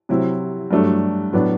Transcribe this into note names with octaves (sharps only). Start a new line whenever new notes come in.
C3 F#3 C4 E4
G2 F#3 A3 D4
A2 F#3 B3 D4